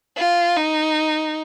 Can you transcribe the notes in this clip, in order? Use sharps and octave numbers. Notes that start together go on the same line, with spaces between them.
F4
D#4